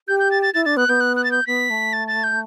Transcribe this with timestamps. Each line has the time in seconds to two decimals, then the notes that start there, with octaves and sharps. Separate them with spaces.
0.08 G4 G6
0.19 G6
0.31 A6
0.42 A6
0.54 E4 A6
0.65 D4 A6
0.77 B3 F#6
0.88 B3 G6
1.00 F#6
1.16 F#6
1.24 A6
1.32 G6
1.47 B3 B6
1.70 A3
1.93 A6
2.08 A6
2.23 G6